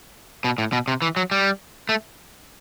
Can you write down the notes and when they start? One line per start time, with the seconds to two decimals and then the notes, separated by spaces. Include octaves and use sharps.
0.44 B2
0.58 A2
0.72 B2
0.88 C3
1.02 E3
1.16 F#3
1.31 G3
1.89 A3